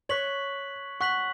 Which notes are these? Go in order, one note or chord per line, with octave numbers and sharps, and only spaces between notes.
C#5 C#6 F#6 B6 F#7
F#5 C#6 F#6 B6 F#7